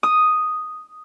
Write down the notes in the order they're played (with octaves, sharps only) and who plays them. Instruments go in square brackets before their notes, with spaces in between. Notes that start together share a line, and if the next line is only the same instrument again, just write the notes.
[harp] D#6